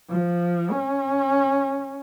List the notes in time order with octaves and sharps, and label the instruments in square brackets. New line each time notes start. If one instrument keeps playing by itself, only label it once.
[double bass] F3
C#4